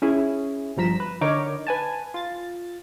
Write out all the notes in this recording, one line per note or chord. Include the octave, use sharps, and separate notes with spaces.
C#4 E4 G#4
G1 G2 F3 A#5 B6 E7
B4
D3 D#4 A#4 C#5 D6
B4 G#5 A5
F4 A6